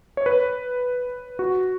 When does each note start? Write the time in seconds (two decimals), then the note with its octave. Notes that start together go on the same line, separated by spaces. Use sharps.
0.17 C#5
0.26 B4
1.39 F#4